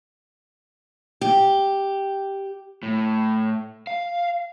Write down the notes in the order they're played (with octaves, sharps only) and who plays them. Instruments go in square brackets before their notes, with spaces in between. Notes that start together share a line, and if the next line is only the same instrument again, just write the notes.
[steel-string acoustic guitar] G4
[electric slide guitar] A2
F5